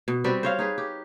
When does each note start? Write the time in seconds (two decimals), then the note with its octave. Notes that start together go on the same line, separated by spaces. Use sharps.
0.08 B2
0.24 G3 C4 F#4 B4
0.43 C5 C#5 F5
0.59 D#4 G#4 B4
0.78 G4